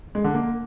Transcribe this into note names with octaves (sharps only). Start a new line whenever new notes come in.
G#3
D3
A#3